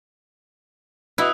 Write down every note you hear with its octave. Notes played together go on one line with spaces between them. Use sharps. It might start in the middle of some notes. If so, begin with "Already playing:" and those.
B2 E4 D#6 E6 F#6